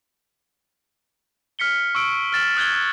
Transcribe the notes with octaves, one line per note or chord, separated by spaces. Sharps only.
F6 B6 C#7 G7
C#6 E6 D7
F6 A6 E7 F#7
D#6 F#6 G#6 G7